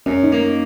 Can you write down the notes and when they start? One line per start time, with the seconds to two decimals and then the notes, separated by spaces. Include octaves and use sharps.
0.06 F#2 C#4
0.24 D#4
0.32 A#3